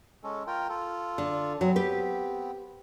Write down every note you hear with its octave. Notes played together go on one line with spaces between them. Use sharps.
G#3 C#4 A4
F4 A#4 G5
F4 A4
D3
F#3 B3 C4
G4 B4